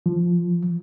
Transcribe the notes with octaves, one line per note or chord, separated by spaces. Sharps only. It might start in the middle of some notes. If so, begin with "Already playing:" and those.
F3